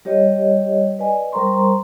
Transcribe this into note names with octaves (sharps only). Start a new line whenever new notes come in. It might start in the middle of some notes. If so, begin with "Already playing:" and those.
G3 G4 C#5 D#5
B4 D5 D#5 G#5
G3 A#4 C5 A#5 C6 C#6